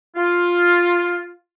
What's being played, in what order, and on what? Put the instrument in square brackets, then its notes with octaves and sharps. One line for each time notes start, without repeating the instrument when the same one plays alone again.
[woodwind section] F4